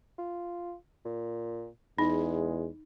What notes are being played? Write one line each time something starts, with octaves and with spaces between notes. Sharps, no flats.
F4
A#2
E2 G#3 D#4